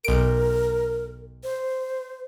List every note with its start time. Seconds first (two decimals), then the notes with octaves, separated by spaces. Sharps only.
0.04 B1 A#4 D7
1.44 C5